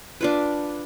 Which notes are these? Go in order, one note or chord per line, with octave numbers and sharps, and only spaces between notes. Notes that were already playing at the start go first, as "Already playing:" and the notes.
D4 F4 B4